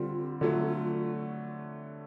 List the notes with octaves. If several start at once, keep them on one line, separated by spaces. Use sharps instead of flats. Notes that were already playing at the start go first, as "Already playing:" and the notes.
Already playing: D3 G3 C4 F4
D3 F#3 A3 F4
F4